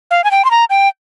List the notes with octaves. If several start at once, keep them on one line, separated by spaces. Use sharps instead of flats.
F5
G#5
G5
C6
A#5
G5